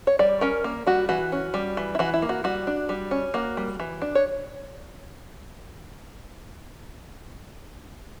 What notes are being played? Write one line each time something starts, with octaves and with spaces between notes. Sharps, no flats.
C#5
G3 D5
C#4 A#4
A#3
G3 F#4
E3 F#4
C#4
G3
E3
E4
E3 F#4
E4
A#3
F#4
G3 F#4
D4
G3
C#4
A#3 F#4
G3
E3
D4
C#5